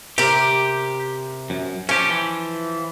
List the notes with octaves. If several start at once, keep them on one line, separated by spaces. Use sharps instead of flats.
C3 G4 A#4
F#2
F3 C#4 G4
E3